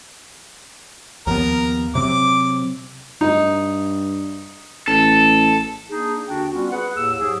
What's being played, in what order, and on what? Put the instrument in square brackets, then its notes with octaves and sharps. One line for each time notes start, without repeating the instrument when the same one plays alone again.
[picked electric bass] D#2 F3 B3 [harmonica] A#4
[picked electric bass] C3 F#3 C4 [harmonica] D6
[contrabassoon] G2 [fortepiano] D#4
[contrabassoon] A1 [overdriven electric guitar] A4
[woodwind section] A#3 D4 D#4 G#4
D#2 D3 D4 F#4 G5
G3 B3 C#4 F4 F#4
G#4 B4 F#5
D#2 A2 E6
G#2 F#3 G4 G#4